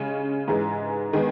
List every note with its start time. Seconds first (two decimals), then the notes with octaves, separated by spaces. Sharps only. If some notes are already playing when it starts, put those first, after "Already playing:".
Already playing: C#3 G#3 C#4
0.48 G#2 E3 G#3
1.13 D#3 G#3 B3